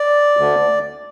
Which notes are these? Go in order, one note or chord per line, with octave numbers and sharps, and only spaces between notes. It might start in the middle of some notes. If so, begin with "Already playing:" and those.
Already playing: D5
D2 D3